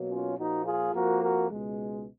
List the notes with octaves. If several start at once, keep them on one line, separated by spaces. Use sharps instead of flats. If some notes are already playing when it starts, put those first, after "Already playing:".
Already playing: B2 F#3 A#3
C#4 F4
A#2 F3 A#3 D#4 F#4
F4 G#4
F2 F3 A#3 F#4 A#4
F#4 A#4
C#2 B2 G#3